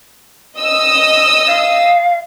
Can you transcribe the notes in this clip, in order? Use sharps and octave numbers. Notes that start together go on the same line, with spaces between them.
D#5 D#6 E6
F5